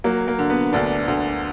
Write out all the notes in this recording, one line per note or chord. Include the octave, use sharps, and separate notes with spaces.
F#3 A#3
A#3
D3
B3
D2 D4
D2